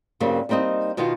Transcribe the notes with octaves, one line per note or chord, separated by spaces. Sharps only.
G2 C#3 F#3 G3 A#3 C4
G3 A#3 C4 D#4 D#5
B2 D#3 F4 F#4 F5